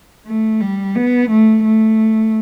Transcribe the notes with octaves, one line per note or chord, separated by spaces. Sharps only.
A3
G3
B3
A3
A3